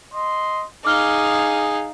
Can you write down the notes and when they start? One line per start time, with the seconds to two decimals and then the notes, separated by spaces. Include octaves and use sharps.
0.14 D#5 C6
0.85 D#4 G#4 F5 D6 F6 G7